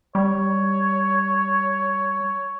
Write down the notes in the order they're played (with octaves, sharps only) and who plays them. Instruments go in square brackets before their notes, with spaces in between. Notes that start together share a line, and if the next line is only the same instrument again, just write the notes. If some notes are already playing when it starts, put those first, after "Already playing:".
[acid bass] G3 [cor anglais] C#5